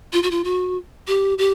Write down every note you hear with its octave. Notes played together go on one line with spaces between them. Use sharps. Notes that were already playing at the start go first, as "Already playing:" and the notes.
F4
F#4
F4
F#4
G4
G4